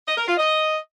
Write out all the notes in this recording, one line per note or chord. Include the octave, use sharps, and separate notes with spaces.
D#5
A#4
F4
D#5